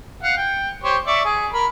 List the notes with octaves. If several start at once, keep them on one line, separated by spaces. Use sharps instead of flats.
F5 F#5
G5
G4 C5 C#5
D5 E5 C#6
G#4
A#4 B5